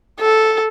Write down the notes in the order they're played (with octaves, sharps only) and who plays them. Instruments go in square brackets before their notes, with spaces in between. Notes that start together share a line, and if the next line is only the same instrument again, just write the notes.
[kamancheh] A4